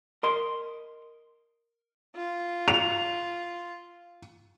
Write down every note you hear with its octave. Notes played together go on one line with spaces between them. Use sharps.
A#4 D#5 C6
F4
F7